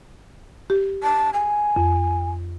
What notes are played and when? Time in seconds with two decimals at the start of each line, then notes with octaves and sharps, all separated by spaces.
0.70 G4
1.03 A5
1.34 G#5
1.76 F2